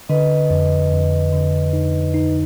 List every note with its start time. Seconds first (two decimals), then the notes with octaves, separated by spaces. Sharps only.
0.09 D3 B4 D#5
0.51 F2
0.92 F2
1.33 D3
1.73 D#4
2.14 D#4